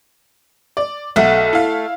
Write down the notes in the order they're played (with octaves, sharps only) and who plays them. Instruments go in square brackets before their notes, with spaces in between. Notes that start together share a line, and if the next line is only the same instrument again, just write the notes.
[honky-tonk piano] D5
[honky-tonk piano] B1 [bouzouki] A3 F#5
[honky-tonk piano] E4 F5